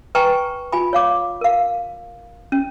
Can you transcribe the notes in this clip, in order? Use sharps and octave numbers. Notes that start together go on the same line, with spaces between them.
B4 G5 G#5 A#5 C#6
F4 G#5 B5
C#5 F5 D6
A#4 F5
C#4